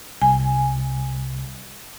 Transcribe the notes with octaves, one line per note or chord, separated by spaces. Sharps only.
C2 G#5